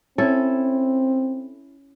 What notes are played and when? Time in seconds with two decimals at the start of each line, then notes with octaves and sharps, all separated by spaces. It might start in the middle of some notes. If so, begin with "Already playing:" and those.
0.18 C4 C#4 E4 A4